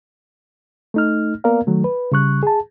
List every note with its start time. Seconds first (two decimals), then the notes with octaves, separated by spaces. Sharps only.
0.94 A3 D#4 F6
1.44 A#3 B3 A#4 D5 F5
1.67 D#3 F#3 A3
1.84 B4
2.12 C#3 G3 C#6 F#6
2.43 G#4 A5